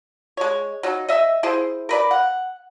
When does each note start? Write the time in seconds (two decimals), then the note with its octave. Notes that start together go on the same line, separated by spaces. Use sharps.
0.37 G#3 C#5
0.83 F#3 D#4
1.09 D#5 E5
1.43 E4 G#4 C5
1.89 A#4 B4 D5
2.11 F#5